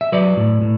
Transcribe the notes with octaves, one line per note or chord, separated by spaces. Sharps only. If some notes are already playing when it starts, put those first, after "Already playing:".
E5
F#3 B4 D5
A2
A2